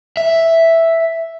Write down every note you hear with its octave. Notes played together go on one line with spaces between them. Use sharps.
E5